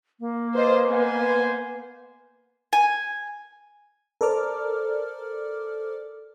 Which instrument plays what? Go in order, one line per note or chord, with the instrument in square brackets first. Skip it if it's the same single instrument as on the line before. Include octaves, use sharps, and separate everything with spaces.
[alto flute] A#3
[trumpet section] F4 G#4 C6 [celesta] B4 D#5 [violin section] C5
[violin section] B3 [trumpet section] C5 G#5
[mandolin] G#5
[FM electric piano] A4 A#4 C5 D5 D6 F6